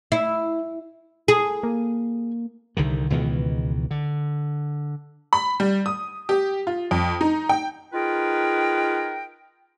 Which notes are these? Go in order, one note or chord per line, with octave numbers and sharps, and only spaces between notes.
E4
G#4
A#3
C2 D3 D#3
C#2 B2 D#3 E3
D3
B5
G3
D#6
G4
F4
F2
D#4
G5
D#4 F4 G#4 A#4 B4 G5